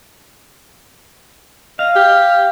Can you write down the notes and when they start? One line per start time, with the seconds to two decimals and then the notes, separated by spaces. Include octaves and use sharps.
1.79 D#5 F5
1.96 G4